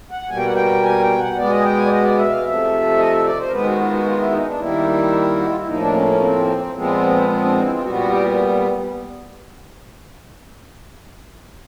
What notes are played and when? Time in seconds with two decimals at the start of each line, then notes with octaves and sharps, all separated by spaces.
0.11 F#5
0.29 B2 G3 A#3 G#5
0.37 G5
0.46 F#5
0.54 G5
0.83 G#5
1.01 G5
1.19 F#5
1.36 B2 G#3 B3 D5
1.50 D#5
1.59 G#5
1.64 G5
1.77 G#5
1.86 D5
1.90 D#5
2.03 D5
2.18 E5
2.30 F5
2.44 C3 F3 A3 E5
2.98 D#5
3.12 E5
3.24 D5
3.38 C5
3.47 A#4
3.51 D#3 G#3 B3 B4
3.65 F#4
3.79 F4
3.92 F#4
4.05 F4
4.19 E4
4.32 D#4
4.46 D4
4.59 D#3 G3 A#3 E4
5.37 F#4
5.46 F4
5.57 E4
5.67 A2 F3 A#3 D#4
5.80 D4
5.94 C#4
6.07 C#4
6.20 C4
6.74 A#2 F3 G#3 B3 C4
7.28 C4
7.44 D4
7.53 D#4
7.62 E4
7.72 F4
7.81 A#2 G3 B3 F#4
7.95 F#4
8.09 G4